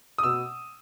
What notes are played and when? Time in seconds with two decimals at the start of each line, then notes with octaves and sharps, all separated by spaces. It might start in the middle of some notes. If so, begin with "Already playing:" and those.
0.18 D#6
0.23 B2 E6